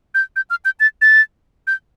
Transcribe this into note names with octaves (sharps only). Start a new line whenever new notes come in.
G6
G6
F6
G6
A6
A6
G6